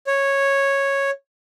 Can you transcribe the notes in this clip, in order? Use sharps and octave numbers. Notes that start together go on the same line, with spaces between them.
C#5